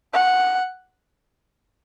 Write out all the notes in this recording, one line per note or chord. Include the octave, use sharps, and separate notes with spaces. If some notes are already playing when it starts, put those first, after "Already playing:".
F#5